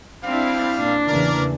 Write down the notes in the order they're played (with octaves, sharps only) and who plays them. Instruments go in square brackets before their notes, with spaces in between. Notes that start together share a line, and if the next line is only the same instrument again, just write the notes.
[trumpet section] G3 F5 [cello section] C4 D4 E4
[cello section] A#2 [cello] D4
[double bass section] E2 C#3 E3 [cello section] A#3 [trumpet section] A#4 D5